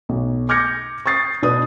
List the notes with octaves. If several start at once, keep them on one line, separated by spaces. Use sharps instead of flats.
B1
D6 F6 G6 G#6 A#6 C#7
C#6 D#6 A6 C7
B2 D4 B4 D#6